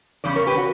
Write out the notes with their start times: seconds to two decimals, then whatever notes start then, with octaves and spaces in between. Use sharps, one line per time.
0.24 E2 C#3 G3 C#4 D5
0.36 A#4 C#5
0.47 G4 B4
0.58 F#4